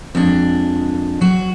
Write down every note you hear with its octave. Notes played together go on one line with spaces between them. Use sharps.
F2 G#3 D4
F#3 F#4